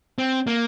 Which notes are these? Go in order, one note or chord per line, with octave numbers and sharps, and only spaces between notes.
C4
A#3